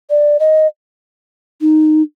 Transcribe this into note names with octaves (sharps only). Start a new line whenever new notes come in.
D5
D#5
D#4